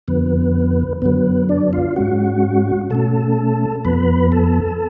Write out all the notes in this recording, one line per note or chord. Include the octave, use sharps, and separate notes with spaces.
F2 D3 F3 B3 B4
F#2 D3 F#3 B3 B4
D4 D5
F4 F5
G#2 G#3 C#4 F#4 F#5
B2 A3 C#4 A4 A5
F2 F3 B3 B4 B5
A4 A5